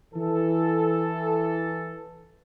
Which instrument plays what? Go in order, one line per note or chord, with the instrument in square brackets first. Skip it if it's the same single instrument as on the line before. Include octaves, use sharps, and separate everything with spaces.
[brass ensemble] E3 A4